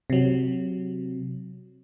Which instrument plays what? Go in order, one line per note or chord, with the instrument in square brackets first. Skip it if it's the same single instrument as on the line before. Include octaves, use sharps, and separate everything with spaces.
[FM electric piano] C3 F#3